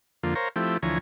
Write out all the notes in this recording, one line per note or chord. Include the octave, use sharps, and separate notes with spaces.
F2 D3 A#3 F4
A#4 C5 C#5 F5 A#5
F3 A3 C4 E4 G4
D2 E3 F3 C#5 G#5 A#5